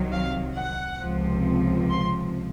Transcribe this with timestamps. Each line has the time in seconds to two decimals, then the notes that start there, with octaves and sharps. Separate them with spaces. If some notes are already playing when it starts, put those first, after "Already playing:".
Already playing: C2 C3 D#3 F#3
0.13 F5
0.56 F#5
1.01 C#2 C3 F3
1.90 C6